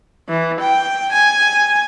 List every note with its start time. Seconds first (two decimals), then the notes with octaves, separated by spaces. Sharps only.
0.28 E3
0.60 G5
1.12 G#5